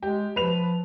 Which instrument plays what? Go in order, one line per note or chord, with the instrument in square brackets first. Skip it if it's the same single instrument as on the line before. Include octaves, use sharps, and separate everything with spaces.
[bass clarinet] G#3 [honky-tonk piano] G4
[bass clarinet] F3 [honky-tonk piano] B4 F7